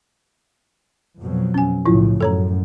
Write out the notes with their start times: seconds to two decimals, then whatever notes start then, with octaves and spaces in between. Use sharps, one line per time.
1.20 F2 B2 F#3
1.54 C#4 G#5
1.86 B1 A2 C#3 F3 E4 F4
2.21 F#2 A2 A4 C#5 A#5